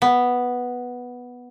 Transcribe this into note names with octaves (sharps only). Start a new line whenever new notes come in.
B3